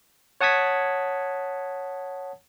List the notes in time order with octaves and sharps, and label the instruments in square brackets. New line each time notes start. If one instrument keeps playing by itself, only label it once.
[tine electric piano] C#5 F#5 A5 D#6 G#6 B6